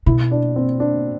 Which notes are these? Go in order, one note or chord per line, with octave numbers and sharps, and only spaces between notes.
B2 E4
D4
C4
D4